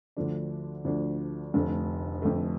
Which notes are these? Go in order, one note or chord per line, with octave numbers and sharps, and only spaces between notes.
D2 D3 F3 A3 D4
D2 D3 F3 A3 D4
F1 F2 D3 A3
F1 F2 D3 A3